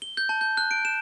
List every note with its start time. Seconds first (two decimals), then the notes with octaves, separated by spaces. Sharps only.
0.02 G7
0.17 G6
0.29 A5
0.41 G6
0.57 F#6
0.71 D7
0.85 E7